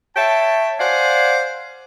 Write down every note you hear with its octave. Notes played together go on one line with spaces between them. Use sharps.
C#5 E5 G5 A5
C5 D5 F5 F#5 G#5